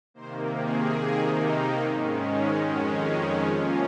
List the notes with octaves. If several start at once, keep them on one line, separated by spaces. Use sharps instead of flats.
C3 D#3 A#3 C5
G#4
C3 D#3 A#3 D#4
G#2 D#3 G#3 C#4
F2 D#3 G#3 C#4 F#4
G#4
C3 F3 A#3 C#4 F4